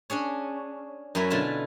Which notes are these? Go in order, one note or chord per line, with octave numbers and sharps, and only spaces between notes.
C#4 D4 G#4 C#5
F#2 F#3 C#4 E4 B4
B2 D3 E4 F4 A5